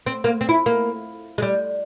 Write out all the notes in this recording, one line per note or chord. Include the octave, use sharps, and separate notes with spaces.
C4
A#3
C4
E4
A#3
G#3
G3